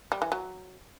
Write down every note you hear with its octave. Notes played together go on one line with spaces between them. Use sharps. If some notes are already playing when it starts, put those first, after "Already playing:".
G3
E3
F#3